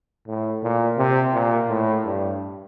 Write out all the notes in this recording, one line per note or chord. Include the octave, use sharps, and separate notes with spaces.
A2
A#2
C3
A#2
A2
G2